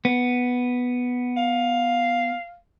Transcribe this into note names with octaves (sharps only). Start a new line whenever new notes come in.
B3
F5